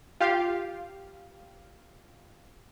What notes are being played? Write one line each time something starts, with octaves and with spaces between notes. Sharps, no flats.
F4 G4 F5